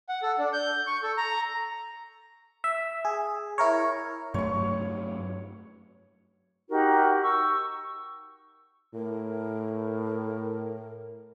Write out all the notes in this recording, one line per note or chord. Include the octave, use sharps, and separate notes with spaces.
F#5
A4
D4
G6
C#6
A4
A#5
E5
G#4
E4 A#4 C#5
G2 F#3 A3 C#5 C#6
D#4 F#4 G4 A#4
C#6 E6
A2 A#4